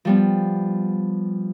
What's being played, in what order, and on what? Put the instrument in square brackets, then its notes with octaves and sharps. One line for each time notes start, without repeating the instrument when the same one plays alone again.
[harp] F3 G3 B3